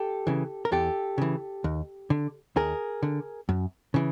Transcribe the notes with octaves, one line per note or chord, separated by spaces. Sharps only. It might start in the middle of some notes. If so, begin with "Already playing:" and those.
Already playing: G4 A4
C#3 E3
A#4
E2 G4 A4
C#3 E3
D#2
D3
D#2 G#4 A#4
D3
F#2
C#3 E3